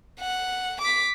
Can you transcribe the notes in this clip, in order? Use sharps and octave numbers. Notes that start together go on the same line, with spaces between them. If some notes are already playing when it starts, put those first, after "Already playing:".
F#5
D6 B6